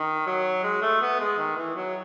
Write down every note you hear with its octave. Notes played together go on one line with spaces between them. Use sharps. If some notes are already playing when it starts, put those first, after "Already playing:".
Already playing: D#3
F#3
G#3
A3
B3
G#3
D#3
E3
F#3